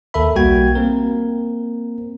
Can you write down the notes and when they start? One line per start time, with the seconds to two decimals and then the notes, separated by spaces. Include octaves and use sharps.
0.14 D#2 A4 A#4 E5 B5
0.35 B1 G3 A#3 F#4 G5 G#6
0.75 A#3 C4 A#4